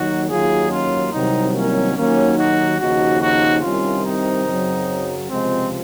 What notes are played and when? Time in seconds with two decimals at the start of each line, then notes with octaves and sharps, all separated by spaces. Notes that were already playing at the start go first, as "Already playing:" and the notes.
Already playing: D#2 D#3 F#3 D#4 F#4
0.30 D#2 D#3 F#3 F4 G#4
0.71 C#4 F4
1.13 C2 C3 D#3 F#3 C4 D#4
1.54 A#3 C#4
1.96 D#2 D#3 F#3 A#3 C#4
2.38 D#4 F#4
2.80 D#2 C#3 F3 D#4 F#4
3.21 D#4 F#4
3.63 C2 C3 D#3 C#4 F4
4.05 C4 D#4
4.47 F#2 C#3 F#3
5.30 C#2 C3 F3 G#3 C4